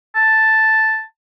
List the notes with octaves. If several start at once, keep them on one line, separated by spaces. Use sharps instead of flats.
A5